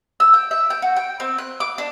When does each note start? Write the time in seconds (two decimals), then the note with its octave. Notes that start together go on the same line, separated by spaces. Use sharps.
0.20 E6
0.34 G5
0.51 E5
0.70 G5
0.82 F#4
0.96 G5
1.20 C4
1.38 F#6
1.60 D6
1.78 D4